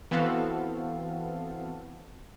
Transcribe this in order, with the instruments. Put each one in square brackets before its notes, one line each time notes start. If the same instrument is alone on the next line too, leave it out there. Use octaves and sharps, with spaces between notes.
[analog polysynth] E3 B3 C4 F#4 A4 F5